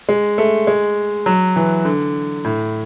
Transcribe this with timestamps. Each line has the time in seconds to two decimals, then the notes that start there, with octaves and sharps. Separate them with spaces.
0.09 G#3
0.38 A3
0.67 G#3
1.26 F#3
1.56 E3
1.85 D3
2.44 A2